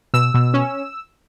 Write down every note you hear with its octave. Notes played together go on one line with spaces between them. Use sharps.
B2 E6
B2
C#4